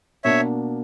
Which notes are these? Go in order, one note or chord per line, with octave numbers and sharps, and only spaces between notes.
B2 A#3 D4 C#5 E5